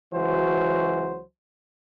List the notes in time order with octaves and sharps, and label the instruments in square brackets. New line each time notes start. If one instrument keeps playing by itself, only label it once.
[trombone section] C#2 E3 F#3 F#4 C5